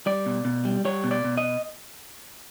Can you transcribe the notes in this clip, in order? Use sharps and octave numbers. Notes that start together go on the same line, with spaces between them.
G3 D5
B2
B2
G3
G3 C#5
B2
D5
B2
D#5